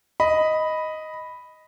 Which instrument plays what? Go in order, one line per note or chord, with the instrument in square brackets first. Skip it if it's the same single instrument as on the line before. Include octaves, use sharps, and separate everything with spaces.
[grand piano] D#5 [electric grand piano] B5